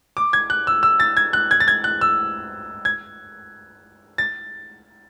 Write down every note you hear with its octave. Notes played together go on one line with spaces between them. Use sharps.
D6
G#6
F#6
E6
E6
A6
G#6
F#6
G#6
A6
G#6
F#6
E6
G#6
A6